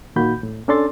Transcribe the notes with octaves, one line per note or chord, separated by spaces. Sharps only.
A#2 D#3 A#3 F#4 B5 G6
A2
C#4 D4 A4 D5 C6 A6